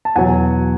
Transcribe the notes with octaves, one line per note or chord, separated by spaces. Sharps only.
A5
E2 B2 F#3 F#5 G#5